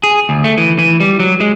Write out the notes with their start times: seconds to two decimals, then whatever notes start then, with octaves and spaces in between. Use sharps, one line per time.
0.03 G#4
0.29 D2
0.44 A3
0.57 E3
0.78 E3
1.00 G3
1.20 F#3
1.41 G#3